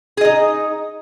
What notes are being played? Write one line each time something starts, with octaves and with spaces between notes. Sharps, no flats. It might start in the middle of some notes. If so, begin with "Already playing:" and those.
D#4 G#4 D#5